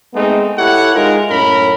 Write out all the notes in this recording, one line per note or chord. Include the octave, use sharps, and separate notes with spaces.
G#3 A3 B3 C4 D#4
E4 G4 A4 C#5 F#5
G#3 D#4 F4 A#4
F#2 A2 C#4 A#4 B5